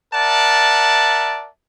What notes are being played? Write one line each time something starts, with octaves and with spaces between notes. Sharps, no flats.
A#4 D5 E5 F#5 A5